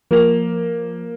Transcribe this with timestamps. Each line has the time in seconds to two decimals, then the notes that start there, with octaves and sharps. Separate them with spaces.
0.11 F3 A#3 F7